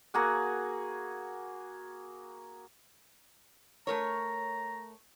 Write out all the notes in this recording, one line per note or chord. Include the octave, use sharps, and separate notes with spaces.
A#3 F#4 G#4 F#5
A3 A#4 C#5 A#5